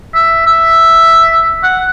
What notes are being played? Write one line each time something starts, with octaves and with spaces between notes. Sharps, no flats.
E5
E5
F#5